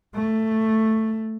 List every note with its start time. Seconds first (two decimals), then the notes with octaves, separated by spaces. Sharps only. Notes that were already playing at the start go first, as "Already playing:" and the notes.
0.14 A3